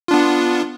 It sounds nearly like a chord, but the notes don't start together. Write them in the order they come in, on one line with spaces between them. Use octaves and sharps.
F4 D4 B3